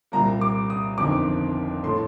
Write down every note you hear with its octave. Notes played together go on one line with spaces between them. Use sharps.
C2 A#2 G3 A#3 A#5
D6
D#6
G1 F2 D#3 D6
A2 A3 C6